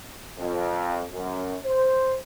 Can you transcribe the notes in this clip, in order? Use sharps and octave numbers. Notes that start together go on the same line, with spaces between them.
F2
F#2
C5